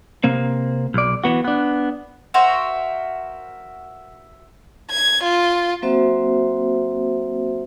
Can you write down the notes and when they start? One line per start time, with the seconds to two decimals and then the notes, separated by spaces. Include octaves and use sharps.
0.24 C3 A#3 C4
0.94 B1 D5
1.24 E3 B3 F#4
1.44 B3 D4
2.34 F#4 A#4 C5 E5
4.91 G#6
5.23 F4
5.82 F#3 A#3 C4 F#4 C5 E5